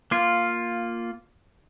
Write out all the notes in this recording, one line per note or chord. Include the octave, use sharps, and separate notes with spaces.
A#3 F4